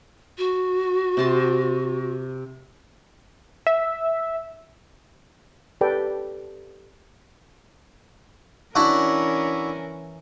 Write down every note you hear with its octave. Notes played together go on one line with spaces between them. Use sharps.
F#4
C3 A5 C6
E5
G4 A4 B4 D5 G5
E3 C#4 D4 E4 F#4 A#4